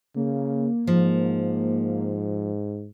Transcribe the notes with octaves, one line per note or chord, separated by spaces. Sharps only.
C#3 A#3
G#2 F3